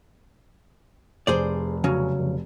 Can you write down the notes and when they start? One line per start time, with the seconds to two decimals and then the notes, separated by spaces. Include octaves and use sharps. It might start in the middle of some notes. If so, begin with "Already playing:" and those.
1.27 F1 G#4 C5 D5
1.84 C#3 F#3 C#4
2.19 F1